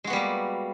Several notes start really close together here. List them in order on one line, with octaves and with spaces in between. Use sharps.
G#3 F#4 B3 G3 A#3